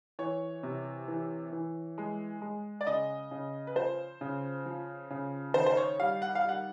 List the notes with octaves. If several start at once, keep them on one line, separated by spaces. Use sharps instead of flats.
E3 C#5
C3
E3
E3
G#3
G#3
D5
C#3 D#5
C#3
B4
F3 C5
C#3
F3
C#3
D#3 C5
C5
C#5
G3 F5
F#5
F5
G3 F#5